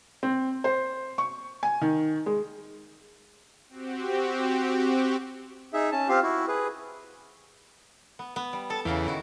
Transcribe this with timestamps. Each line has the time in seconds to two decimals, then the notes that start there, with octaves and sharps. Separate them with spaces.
0.23 C4
0.64 C5
1.18 C#6
1.63 G#5
1.81 D#3
2.26 G#3
3.69 C4 F#4 G4
5.73 D#4 G#4 E5
5.92 C#4 A5
6.08 C4 F4 G4 F5
6.22 E4 F#4
6.48 G#4 B4
8.19 B3
8.36 B3
8.53 G3
8.70 A4 A5
8.85 E2 C#3 F5 G5
9.07 D#3 E4 F#4